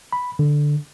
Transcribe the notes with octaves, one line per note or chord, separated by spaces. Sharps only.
B5
D3